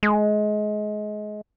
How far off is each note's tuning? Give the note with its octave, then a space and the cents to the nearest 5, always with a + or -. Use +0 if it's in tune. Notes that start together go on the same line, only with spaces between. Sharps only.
G#3 +25